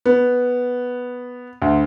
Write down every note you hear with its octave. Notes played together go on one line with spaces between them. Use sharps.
B3
D2